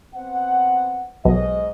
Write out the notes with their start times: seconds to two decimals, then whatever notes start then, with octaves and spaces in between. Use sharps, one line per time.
0.15 B3 C4 F#5
1.25 B1 G#2 D#5